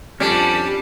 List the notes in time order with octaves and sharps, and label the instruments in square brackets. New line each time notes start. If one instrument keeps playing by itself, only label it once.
[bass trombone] F2 [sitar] G3 [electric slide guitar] C#4 D4 [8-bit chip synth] G4 A5